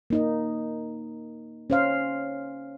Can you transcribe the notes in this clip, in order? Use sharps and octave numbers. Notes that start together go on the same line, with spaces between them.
A#3 D#4 D#5
C#4 C5 F5